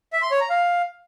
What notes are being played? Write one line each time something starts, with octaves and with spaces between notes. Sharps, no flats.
E5
C6
C#5
A#5
F5